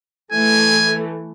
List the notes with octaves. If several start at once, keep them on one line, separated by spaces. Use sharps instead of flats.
E3 A3 G#5